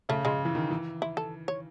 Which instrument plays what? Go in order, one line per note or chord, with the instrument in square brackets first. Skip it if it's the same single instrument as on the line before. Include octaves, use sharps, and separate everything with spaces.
[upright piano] C#3 [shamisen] A3
[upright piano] C#3 [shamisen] G#3
[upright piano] E3
D#3
E3
[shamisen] E4
A4
C#5